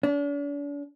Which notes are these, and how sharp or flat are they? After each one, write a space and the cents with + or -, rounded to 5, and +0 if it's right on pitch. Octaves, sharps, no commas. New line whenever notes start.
D4 -45